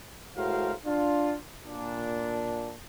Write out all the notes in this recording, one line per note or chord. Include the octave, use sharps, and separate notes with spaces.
A2 G#3 F#4 A#4 C5 F5
D4 F4
A#2 D4